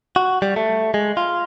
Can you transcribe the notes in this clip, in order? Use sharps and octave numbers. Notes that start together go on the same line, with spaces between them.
F#4
G3
A3
G#3
F4